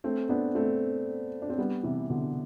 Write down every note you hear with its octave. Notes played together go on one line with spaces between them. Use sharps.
A3 C4
B3 D4
A3 C4
D4
C4
G3 B3
C3 E3
B2 D3